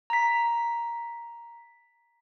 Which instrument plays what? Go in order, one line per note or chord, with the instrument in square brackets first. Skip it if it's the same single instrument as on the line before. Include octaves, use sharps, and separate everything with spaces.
[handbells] A#5 B6